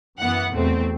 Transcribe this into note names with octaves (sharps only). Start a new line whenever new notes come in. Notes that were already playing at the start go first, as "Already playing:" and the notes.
F#2 E3 B3 F#5
E2 B2 A3 C4